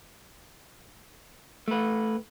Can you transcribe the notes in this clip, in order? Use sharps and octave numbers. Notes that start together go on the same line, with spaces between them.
A3 B4